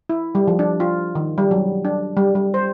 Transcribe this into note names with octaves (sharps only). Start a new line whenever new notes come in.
E4
G3
F3
D4
F4
D#3
G3
F#3
D4
G3
G3
C5